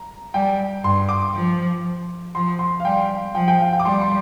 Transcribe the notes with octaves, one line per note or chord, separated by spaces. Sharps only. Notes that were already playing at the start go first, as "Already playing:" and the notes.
Already playing: A#5
G3 G5
G2 C6
D6
F3
F3 C6
C6
F5
G3 G5
F3 G5
G5
F5
G5
D6
G3 C6
C6